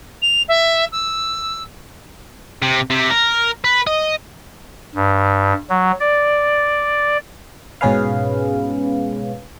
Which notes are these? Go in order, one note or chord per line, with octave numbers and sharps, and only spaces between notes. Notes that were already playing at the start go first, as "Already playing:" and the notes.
F7
E5
E6
C3
C3
A#4
B4
D#5
G2
F#3
D5
G#2 B2 C#4 G#4 B4 F5